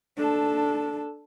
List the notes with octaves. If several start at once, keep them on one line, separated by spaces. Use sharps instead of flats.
D4 A4